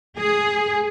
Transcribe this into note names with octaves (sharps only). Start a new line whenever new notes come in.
G#4